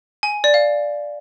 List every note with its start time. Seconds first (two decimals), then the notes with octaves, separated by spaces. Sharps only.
0.23 G#5
0.44 D5
0.54 F5